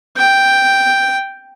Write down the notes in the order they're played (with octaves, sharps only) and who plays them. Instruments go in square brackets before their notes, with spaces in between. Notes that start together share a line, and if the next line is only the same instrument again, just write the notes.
[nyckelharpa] G5